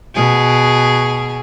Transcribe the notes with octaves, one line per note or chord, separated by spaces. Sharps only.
B2 G#4